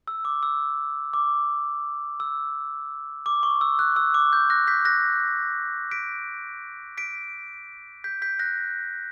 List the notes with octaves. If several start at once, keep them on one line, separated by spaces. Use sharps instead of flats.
E6
D6
E6
D6
E6
D6
C#6
E6
F#6
E6
D6
G6
F#6 A#6
G6 B6
F#6 A#6
B6 D7
B6 D7
G6 B6
G6 B6
F#6 A#6